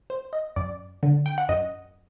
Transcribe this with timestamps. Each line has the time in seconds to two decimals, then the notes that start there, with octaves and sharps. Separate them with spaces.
0.10 C5
0.33 D#5
0.56 F#2 D5
1.03 D3
1.26 G5
1.38 F#5
1.49 F#2 D#5